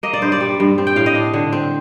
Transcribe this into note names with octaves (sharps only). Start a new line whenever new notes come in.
A#3 D#5
D5
G2 C5
D5
G3
G2
C4
G5
A2 F5
D#5
D4
D3
C4